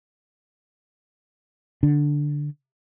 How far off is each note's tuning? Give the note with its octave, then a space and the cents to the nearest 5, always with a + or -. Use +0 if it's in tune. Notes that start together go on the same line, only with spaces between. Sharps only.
D3 +0 D4 +0